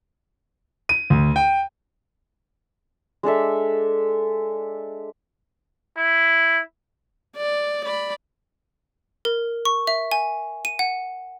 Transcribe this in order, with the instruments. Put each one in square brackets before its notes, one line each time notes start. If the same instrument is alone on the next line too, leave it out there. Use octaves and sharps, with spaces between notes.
[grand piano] D#7
D2
G5
[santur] G#3 D4 A4 E5
[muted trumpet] E4
[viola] D5
D5 B5
[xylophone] A#4
C#6
E5
G#5
D#7
F#5